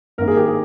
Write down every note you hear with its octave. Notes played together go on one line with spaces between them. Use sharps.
G#1 G2 D#3 A#3 A#4
G#4
G4
G#4